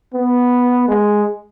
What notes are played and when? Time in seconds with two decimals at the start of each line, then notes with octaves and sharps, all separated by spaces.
0.14 B3
0.88 G#3